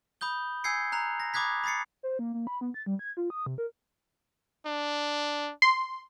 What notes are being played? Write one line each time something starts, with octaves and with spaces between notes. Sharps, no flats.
B5 D#6 G6 G7
G#5 E6 G6 G#6 C7 C#7
A#5 F#6 F7
A#6
B5 D6 D#6 F#6 G#6 B6
B5 D#6 A6 C7 C#7
C5
A#3
A#3
B5
B3
A6
G3
G#6
F4
D#6
C3
A#4
D4
C6